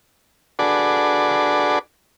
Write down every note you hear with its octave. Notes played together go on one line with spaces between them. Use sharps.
D4 F#4 G#4 A4 B4 D5